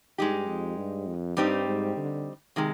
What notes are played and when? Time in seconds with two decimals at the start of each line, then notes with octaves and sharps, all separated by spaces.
0.18 G2 G#3 D#4 G4
0.47 F2
0.78 G2
1.07 F2
1.37 G2 G3 C4 D#4 G4
1.67 G#2
1.97 D3
2.56 C3 D#3 G#3